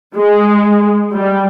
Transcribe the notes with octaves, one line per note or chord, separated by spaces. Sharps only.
G#3
G3